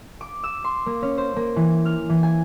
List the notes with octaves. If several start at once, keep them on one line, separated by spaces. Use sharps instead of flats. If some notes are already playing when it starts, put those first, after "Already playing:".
D6
E6
C6
A#3
C#4
C5
A#3
E3
F6
E3
G#5